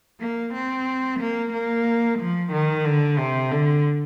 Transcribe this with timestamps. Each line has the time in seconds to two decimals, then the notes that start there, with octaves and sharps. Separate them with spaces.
0.20 A#3
0.54 C4
1.20 A#3
1.53 A#3
2.19 F3
2.52 D#3
2.85 D3
3.18 C3
3.51 D3